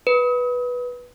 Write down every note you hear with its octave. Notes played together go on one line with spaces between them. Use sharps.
B4